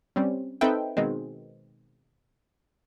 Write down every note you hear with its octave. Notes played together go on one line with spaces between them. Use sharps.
G3 C4 C#4
C4 D#4 A4 B4 E5 G5
B2 D#3 G#3 C4